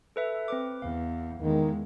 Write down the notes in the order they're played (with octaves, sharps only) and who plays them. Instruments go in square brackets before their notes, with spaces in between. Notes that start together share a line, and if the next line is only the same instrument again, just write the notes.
[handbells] A4 B4 E5
C4 B4 D6
[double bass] E2 [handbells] F5
[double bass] E2 G#3 [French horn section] D#3